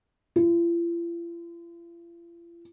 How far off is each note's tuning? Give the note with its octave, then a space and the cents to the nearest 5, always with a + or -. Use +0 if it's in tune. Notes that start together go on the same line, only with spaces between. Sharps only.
F4 -45